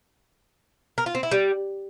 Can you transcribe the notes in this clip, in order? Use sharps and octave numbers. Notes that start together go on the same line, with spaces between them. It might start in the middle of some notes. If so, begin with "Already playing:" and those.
A#4
F4
C4
E4
G3